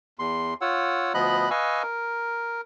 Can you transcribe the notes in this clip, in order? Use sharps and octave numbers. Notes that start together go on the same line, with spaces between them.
E2 C6
F4 C#5 F#5 E6
D2 F3 B3 D#5 B5 F#6
B4 D#5 F5 G#5 C#6 E6
A#4